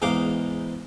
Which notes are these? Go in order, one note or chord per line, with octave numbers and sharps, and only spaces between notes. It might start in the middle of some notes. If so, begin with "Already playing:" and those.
E2 G#2 D#4 F5 D6